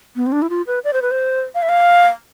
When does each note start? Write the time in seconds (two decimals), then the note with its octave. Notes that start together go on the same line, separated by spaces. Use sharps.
0.16 B3
0.27 C4
0.32 D4
0.42 E4
0.50 F4
0.67 B4
0.84 D5
0.93 C5
1.02 B4
1.11 C5
1.55 F5
1.62 E5
1.69 F5